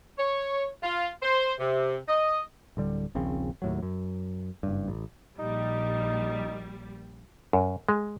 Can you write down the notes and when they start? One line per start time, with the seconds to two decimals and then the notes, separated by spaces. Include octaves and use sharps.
0.18 C#5
0.83 F4
1.23 C5
1.59 C3
2.08 D#5
2.77 D1 D3 G3
3.15 D#1 A#1 C#3 C4
3.62 D#2 A2 F#3
3.82 F#2
4.63 F#1 G2
4.88 A1
5.39 A#1 G3 D#4
7.53 F#2
7.89 G#3